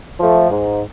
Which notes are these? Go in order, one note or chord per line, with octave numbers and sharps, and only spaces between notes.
F3 A3
G#2